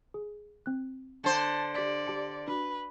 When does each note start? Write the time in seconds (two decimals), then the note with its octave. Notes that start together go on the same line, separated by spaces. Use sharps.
0.14 G#4
0.66 C4 F#6
1.24 D3 C5 A5
1.74 G4 D5 B6 D7
2.07 G4 A5 C#7
2.48 D4 F#4 B4